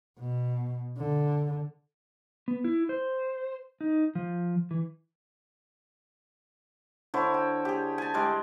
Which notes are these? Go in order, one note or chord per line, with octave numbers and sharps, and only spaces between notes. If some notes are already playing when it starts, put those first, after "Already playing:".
B2
D3
B3
E4
C5
D#4
F3
E3
D3 E4 C5 C#5
G5
G4 G#4
G#5 A5
G3 G#3 D6